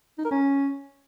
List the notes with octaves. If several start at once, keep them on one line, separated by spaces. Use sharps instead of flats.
D#4
A#4
C#4